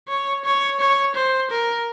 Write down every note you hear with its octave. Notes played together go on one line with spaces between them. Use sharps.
C#5
C#5
C#5
C5
A#4